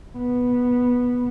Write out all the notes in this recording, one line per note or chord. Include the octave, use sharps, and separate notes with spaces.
B3